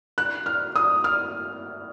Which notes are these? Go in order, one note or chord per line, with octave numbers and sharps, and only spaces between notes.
F#6
F6
D#6
F6